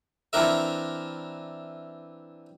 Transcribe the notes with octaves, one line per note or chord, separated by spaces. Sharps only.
E3 C4 D4 A#4 E5